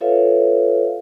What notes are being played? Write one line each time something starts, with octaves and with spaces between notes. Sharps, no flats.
F4 A4 B4 C#5 E5 F5